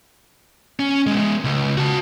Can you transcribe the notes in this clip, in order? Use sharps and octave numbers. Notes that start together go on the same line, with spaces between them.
C#4
G#3 B3
C#2
F#4 A5